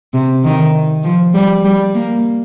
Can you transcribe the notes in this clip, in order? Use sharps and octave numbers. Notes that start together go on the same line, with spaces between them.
C3
D#3
F3
G3
G3
A#3